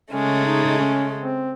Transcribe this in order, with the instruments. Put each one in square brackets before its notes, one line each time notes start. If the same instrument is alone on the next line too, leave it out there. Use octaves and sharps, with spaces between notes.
[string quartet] C#3 G#3 A3 [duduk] C#4
[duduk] D#4
C#4
C4